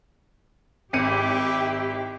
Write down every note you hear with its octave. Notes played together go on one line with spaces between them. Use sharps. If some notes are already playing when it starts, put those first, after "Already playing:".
G#1 E4 G4 E5 D6 C#7 D#7